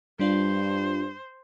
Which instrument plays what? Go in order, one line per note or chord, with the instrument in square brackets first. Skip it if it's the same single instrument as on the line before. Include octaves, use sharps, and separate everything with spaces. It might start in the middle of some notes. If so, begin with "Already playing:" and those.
[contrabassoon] G2 [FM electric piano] G3 D4 F4 [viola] C5